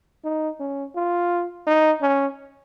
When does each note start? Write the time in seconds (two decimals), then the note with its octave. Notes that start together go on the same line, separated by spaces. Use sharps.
0.24 D#4
0.60 C#4
0.96 F4
1.67 D#4
2.02 C#4